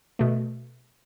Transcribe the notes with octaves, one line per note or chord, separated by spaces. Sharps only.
B2 A3